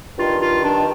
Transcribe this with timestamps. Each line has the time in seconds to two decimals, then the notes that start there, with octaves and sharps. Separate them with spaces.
0.17 G2 D#3 F4
0.40 F4
0.63 D4